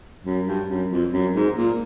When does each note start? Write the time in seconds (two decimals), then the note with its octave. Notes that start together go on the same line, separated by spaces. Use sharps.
0.24 F#2
0.46 G2
0.68 F#2
0.90 F2
1.11 F#2
1.34 G#2
1.56 A#2